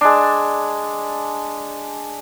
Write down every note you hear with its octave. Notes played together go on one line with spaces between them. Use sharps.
G#3 D4